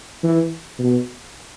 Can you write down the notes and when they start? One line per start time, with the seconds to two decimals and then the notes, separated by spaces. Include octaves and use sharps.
0.23 E3
0.79 B2